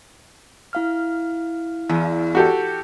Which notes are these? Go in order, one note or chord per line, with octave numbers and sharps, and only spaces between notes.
E4 F5 F6
E2
F#4 G4 A4